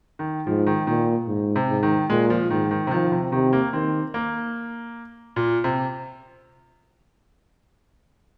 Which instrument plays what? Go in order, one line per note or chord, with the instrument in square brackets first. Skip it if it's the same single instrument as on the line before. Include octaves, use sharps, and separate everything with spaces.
[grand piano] D#3
[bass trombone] G#2 [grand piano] F3
[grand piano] D#3
[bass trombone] A#2 [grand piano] D#3
[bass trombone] G#2
[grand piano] C3
[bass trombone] G#2
[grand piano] D#3
[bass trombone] A#2 [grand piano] G#3
[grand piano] F3
[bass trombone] G#2 [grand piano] D#3
[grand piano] D#3
C3
[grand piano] D#3 [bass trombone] F3
[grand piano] C3
[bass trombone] C3 [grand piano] D#3
[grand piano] A#3
[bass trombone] D#3 [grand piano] C4
[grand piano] A#3
A#2
C3